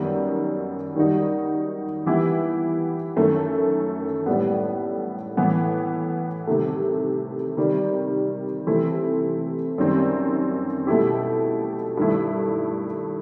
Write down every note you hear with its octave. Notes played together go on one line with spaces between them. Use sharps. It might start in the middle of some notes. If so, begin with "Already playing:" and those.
Already playing: F#2 D#3 G3 B3 D#4
D#3 G3 D#4 F#4
E3 B3 E4 G4
F#2 D#3 A3
A2 G3 B3
A2 E3 B3
C3 D#3 A3
C3 D#3 G3
C3 E3 A3 C4 E4
F#2 D#3 G3 C4
B2 A3 E4 G4
G2 D#3 A3 E4